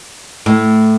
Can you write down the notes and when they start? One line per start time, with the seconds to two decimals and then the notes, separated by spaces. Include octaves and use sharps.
0.46 A2